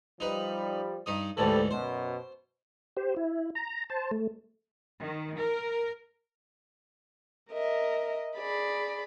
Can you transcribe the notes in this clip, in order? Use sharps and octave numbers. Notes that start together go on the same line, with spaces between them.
F3 G3 D#4 B4
G2 D#4 D#6
D2 G#2 E3 G3 A4
F#2 B2 C5
G4 C5
E4
A#5
C5 A5
A3
D#3
A#4
A#4 D#5 E5
G#4 D5 B5